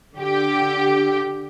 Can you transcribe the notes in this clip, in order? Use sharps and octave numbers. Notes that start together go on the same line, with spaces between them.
D3 G4